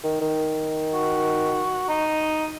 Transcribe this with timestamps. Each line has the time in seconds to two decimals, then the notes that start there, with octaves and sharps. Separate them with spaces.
0.04 D#3
0.21 D#3
0.93 F#4
1.89 D#4